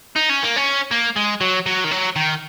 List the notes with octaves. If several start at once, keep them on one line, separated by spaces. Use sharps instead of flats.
D#4
C#4
A#3
C#4
A#3
G#3
F#3
F#3
D#3
F#3
D#3